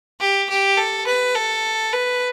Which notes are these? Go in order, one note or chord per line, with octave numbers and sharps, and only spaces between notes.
G4
G4
A4
B4
A4
B4